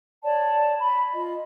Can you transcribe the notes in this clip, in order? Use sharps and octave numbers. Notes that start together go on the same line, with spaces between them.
C#5 D5 A5
B5
F4 D#5